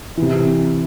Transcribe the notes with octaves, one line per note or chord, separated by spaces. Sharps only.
C3 E3